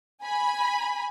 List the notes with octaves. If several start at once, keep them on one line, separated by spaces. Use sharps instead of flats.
G#5 B5